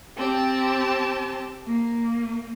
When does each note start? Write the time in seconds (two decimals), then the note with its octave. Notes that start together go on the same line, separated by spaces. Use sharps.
0.17 C4 G4 A5
1.66 A#3